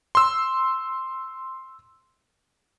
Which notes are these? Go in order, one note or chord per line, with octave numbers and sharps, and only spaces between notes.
C6 E6